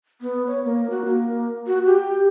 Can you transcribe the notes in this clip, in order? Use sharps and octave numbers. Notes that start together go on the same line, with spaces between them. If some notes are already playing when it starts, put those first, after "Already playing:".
B3
C#5
A#3
F#4
A#3
F#4
G4